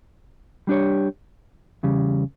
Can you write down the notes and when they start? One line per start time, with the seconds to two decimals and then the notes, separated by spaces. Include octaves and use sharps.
0.67 G3 D4 G4 C#5
1.83 E2 C#3 G3